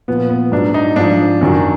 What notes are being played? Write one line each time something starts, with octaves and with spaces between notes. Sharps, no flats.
A#2 F3 B3
B3
G#2 F#3 D4
D#4
G#2 F3 D4
F#2 D#3 F#3